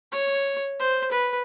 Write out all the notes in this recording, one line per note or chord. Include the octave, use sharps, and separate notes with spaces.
C#5
C5
B4